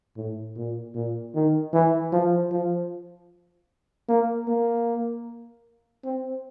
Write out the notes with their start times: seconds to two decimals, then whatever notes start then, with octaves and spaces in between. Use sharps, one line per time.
0.17 A2
0.56 A#2
0.95 A#2
1.34 D#3
1.73 E3
2.13 F3
2.52 F3
4.09 A#3
4.48 A#3
6.05 C4